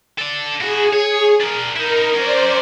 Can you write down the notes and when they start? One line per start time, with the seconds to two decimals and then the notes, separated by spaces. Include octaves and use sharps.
0.18 A4 D5
0.61 E4 F#4 G#4
0.93 C#5
1.40 D4 A#4
1.76 D#4 E4 A#4
2.15 C#4 A#4 C5 D5